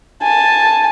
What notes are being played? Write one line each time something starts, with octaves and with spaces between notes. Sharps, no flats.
G#5 A5